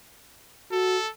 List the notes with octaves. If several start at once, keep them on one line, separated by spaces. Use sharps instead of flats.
F#4 A4